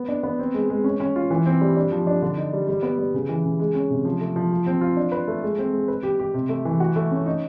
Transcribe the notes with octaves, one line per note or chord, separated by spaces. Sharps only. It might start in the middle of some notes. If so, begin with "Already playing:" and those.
Already playing: B3
D4
B3
C4
G#3
G#3
C#4
C#4
F4
E3
C4
G3
D4
F3
D4
D3
D#4
G3
G3
B3
G3
C#3
E3
C#3
G#3
C#4
C3
F3
A3
F3
F4
C4
F4
D4
B4
A3
G#3
C4
G#3
B4
G4
G4
C3
A3
E3
F#4
A3
C#4
D#4